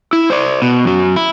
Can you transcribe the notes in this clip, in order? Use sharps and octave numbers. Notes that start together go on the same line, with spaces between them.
E4
C5 D5
B2
F#2 F#3
E4